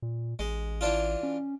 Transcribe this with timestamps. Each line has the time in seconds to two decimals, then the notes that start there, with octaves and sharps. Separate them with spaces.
0.02 A#2
0.39 A1 G#3
0.81 E3 D4 F4
1.23 C#4